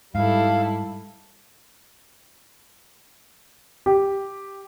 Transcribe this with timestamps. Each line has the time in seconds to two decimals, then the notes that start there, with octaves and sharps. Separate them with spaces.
0.15 G#2 G3 E4 A4 F5
3.86 G4